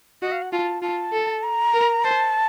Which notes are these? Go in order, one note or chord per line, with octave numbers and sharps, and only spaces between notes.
F#4 D#5
F5
F#5
F4 A5
F4 A5
A4
A#5
A#4
C5 A5